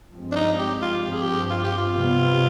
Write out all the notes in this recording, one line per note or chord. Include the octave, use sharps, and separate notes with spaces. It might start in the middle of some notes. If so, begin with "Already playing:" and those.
G2 F3 G#3 C4
D4
D#4
G4
F4
G2 F3 C4 G4
G#4
G4
F4
G4
F4
C3 G3 B3